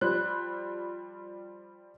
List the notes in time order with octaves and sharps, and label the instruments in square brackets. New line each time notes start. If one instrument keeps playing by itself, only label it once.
[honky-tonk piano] F3 G3 C5 F#6